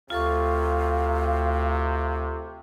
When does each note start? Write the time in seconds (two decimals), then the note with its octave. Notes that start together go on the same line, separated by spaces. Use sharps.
0.10 D2 C3 F4 A4 F5 C#6